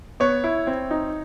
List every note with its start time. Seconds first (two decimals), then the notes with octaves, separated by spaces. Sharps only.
0.20 B3 C#5
0.44 E4
0.67 C4
0.91 D#4